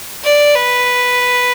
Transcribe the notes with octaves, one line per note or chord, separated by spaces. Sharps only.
D5
B4